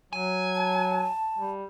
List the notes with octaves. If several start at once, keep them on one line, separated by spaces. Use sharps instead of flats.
F#3 G#5
A5
G3